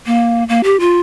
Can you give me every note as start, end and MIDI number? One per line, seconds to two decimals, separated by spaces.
0.06 0.44 58
0.49 0.61 58
0.64 0.77 67
0.80 1.01 65